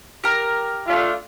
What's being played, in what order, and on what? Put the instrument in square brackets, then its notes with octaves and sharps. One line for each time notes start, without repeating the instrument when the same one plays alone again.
[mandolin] G4 A#4
[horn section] A3 D4 F4